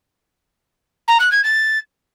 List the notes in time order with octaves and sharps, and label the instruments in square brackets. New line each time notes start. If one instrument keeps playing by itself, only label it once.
[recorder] A#5
F#6
G#6
A6